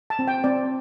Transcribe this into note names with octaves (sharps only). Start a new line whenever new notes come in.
A5
C4
G5
C4 D5